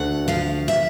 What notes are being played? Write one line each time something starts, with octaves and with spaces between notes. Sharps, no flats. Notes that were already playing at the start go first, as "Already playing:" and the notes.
Already playing: D2 D3 F#5
F3 F5
E5